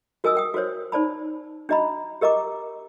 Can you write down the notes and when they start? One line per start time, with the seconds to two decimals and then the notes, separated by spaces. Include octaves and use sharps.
0.24 F#4 A#4 D#5 G#5 D#6 E6
0.35 A#4 G5 D#6
0.54 F#4 A#4 C5 C#5
0.92 D#4 C5 D5 A5 B5
1.69 D4 F#4 D#5 A#5 B5
2.21 G4 A#4 D#5 A#5 D6